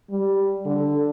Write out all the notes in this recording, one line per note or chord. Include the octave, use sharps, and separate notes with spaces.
G3
D3